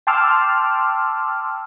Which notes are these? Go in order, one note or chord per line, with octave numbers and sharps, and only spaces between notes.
G5 A5 C6 D6 E6 F6